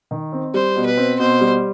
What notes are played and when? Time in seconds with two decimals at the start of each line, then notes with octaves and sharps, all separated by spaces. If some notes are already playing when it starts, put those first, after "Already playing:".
0.11 D#3
0.32 C4
0.54 G3 C5
0.76 B2
0.86 B4
0.97 C4
1.19 B2 C5
1.41 G3